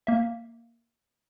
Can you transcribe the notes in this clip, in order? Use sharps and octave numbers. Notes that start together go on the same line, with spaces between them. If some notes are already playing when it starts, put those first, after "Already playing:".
A#3 E5